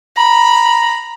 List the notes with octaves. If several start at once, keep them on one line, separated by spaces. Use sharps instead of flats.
A#5 B5